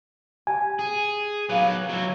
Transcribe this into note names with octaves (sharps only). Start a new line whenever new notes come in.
G4 G#5
G#4
F#3 A#4 B4 F5 G5
F#3 E4